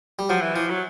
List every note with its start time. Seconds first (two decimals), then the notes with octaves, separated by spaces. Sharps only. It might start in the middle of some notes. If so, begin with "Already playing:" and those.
0.19 G3
0.29 F3 F#3
0.42 E3
0.55 E3 F3
0.70 F#3